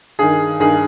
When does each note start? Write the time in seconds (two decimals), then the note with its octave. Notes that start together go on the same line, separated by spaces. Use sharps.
0.19 G2 D#3 G#4
0.60 G2 D#3 G#4